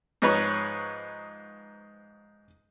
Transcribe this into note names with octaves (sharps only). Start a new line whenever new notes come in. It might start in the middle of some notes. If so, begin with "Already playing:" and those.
G#2 F3 D#4 B4 C#5 C#6